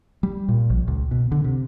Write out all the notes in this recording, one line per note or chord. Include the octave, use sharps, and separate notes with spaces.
G3
A#2
A#1
C#2
B2
D3
C3